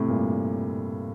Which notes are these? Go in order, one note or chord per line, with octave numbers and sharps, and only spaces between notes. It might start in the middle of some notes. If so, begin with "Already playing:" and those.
Already playing: A2 C3
G2 A#2